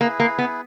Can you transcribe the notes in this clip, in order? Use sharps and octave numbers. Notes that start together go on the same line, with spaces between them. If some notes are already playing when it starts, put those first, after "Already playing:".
A#3 E4 G#4 B4
A#3
B3